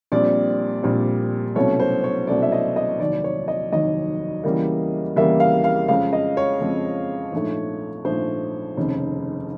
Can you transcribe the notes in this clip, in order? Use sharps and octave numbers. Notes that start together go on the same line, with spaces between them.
A#1 A#2 G3 C4 D5
A#1 A#2 G3 C4
C2 B2 F#3 A3 C#4 C#5
C5
C#5
C2 B2 F#3 A3 C#4 D5
E5
D#5
D#5
F1 D#2 D#3 F#3 D5
C#5
D#5
F1 D#2 D#3 F#3 D#5
E2 C#3 E3 G3 A#3
E2 C#3 E3 G3 A#3 E5
F5
F5
F2 C#3 F3 G#3 C4 F5
D#5
C#5
F2 C#3 F3 G#3 C4
A#1 G#2 F3 A3
A#1 G#2 F3 A3 C5
F1 D#2 C#3